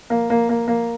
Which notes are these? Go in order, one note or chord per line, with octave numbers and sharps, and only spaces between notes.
A#3
A#3
A#3
A#3